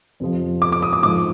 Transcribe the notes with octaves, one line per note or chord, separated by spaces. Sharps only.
F2 C3 F3
D6
D6
D#6
D6
G#2 F3 D6